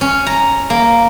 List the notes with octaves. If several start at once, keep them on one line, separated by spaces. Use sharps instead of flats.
C#4
A#5
A#3